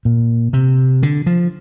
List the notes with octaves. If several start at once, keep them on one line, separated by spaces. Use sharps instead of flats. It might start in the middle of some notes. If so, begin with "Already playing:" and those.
A#2
C3
D3
F3